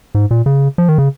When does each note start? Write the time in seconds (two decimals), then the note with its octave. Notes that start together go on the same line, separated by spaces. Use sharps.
0.15 G#2
0.31 A#2
0.46 C#3
0.78 F3
0.88 D#3
0.98 C#3